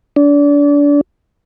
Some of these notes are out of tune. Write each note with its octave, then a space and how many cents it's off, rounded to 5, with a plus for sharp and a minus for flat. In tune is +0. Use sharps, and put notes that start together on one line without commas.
D4 -30